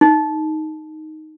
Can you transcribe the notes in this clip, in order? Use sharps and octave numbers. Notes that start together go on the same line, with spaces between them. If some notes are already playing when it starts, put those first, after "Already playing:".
D#4